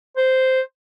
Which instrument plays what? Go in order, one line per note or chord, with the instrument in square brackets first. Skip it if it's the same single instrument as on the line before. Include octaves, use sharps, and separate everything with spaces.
[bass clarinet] C5